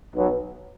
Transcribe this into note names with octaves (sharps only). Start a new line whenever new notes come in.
B1 B2 F#3